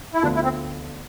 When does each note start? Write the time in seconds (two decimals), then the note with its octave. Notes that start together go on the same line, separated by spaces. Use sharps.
0.14 E4
0.22 D2 D3 F3 B3 D4 F4
0.35 E4
0.44 C4